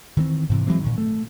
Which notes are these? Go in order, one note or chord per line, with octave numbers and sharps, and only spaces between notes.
D#3 E3 G#3 C4
G#2 C3 E3
E3 F#3 G#3 C4
A#2 D#3
A3